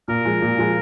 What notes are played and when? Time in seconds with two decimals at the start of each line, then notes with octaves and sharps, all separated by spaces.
0.08 A#2 A#4
0.25 F3 G#3
0.42 A#2
0.58 F3 G#3